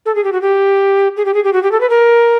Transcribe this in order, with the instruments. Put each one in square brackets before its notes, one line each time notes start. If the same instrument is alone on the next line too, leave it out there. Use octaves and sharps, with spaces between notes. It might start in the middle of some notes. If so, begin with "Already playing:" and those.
[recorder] A4
G#4
G4
F#4
G4
G#4
G4
G#4
G4
F#4
G4
A4
B4
A#4